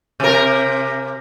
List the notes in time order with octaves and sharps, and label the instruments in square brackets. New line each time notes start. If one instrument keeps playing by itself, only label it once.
[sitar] C3 A#4